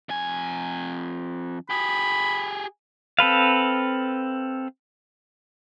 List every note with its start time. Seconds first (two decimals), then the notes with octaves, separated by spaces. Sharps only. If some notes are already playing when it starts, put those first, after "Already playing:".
0.09 F2 G#5
1.70 G4 G#4 B5
3.19 C4 A4 B4 F5